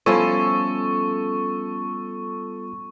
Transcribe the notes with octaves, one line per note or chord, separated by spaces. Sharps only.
F3 G3 B3 C#4 E4 F4 A4 C#6